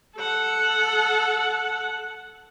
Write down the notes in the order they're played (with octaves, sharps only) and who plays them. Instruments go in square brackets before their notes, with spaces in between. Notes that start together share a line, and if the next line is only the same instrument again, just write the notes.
[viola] A4 F#5